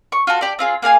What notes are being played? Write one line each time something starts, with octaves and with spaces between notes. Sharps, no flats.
C#6
F4 F#4 A4
G4 D5
C4 F4 G#4
A#3 G#4 F5 G#5